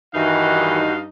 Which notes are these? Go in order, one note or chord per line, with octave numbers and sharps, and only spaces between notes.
G2 D#3 E3 D#4 F#4 F5